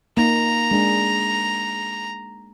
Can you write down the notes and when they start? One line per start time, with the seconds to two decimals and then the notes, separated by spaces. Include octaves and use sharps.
0.17 A#3 D#4 A#5
0.71 G#3 D4 G#4